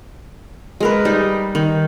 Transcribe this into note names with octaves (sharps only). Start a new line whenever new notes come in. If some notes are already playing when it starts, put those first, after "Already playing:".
G#3 A#4 B4
G3 D#4
D#3